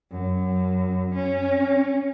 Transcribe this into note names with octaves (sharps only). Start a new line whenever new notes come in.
F#2
C#4